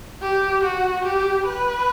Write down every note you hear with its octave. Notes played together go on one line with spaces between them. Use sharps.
G4
F#4
G4
B4